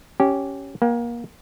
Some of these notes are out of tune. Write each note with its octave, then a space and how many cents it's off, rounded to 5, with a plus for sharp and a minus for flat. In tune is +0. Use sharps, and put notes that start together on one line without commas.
C#4 +0 G4 -15
A#3 +25 G5 +0